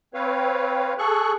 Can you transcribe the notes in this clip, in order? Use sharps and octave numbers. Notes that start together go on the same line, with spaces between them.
C4 B4 C#5 F5
G#4 A4 C#6 F#6